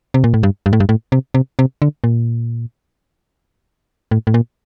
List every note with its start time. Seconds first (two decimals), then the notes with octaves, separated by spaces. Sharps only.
0.14 C3
0.24 A#2
0.34 A2
0.43 G2
0.66 G2
0.73 A2
0.80 G2
0.89 A2
1.12 C3
1.34 C3
1.59 C3
1.82 D3
2.04 A#2
4.11 A2
4.27 A2
4.34 A#2